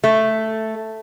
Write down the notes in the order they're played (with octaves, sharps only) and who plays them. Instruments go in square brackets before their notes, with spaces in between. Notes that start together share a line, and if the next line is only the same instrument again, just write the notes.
[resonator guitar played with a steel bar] A3